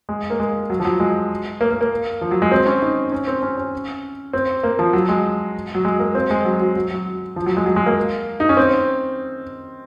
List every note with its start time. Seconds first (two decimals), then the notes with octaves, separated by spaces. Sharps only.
0.09 G#3
0.30 A#3
0.40 G#3
0.70 F#3
0.80 F3
0.85 F#3
1.00 G#3
1.61 A#3
1.71 A#3
1.81 A#3
2.21 F3
2.31 F#3
2.42 G#3
2.51 C4
2.67 C#4
2.82 D#4
3.12 C#4
3.27 C4
3.43 C#4
3.57 C#4
4.33 C4
4.63 A#3
4.79 F3
4.93 F#3
5.09 G#3
5.75 F#3
5.85 G#3
5.99 A#3
6.15 C4
6.31 G#3
6.45 F#3
6.61 F#3
6.76 F#3
6.90 F#3
7.36 F3
7.46 F#3
7.57 G#3
7.66 F#3
7.76 G#3
7.86 A#3
8.40 D#4
8.49 C#4
8.57 C4